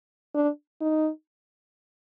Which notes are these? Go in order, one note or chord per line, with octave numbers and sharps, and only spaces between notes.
D4
D#4